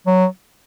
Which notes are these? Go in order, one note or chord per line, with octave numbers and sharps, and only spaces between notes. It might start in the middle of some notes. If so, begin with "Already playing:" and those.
F#3